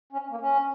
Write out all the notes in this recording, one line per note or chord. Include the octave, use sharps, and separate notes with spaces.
C#4
A#3
C#4